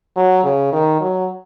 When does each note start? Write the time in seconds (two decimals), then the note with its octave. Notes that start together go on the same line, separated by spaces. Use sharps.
0.16 F#3
0.44 C#3
0.73 D#3
1.01 F#3